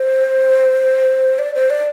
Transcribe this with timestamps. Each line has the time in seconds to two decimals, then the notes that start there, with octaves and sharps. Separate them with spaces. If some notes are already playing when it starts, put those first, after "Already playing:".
Already playing: C5
1.39 D5
1.55 C5
1.70 D5